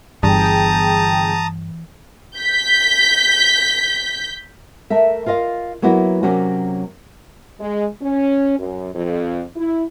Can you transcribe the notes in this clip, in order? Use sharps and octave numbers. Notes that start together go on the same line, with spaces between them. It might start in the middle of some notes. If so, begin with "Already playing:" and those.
G1 G2 E3 G#4 G5 A5 A#5 D#6
G6 B6
A3 A#4 E5
F4 A#4 D#5 F5
F#3 A#3 B3 E4 F#4
C3 F#3 A#3 C#4 F#4
G#3
C#4
F#2
F2
E4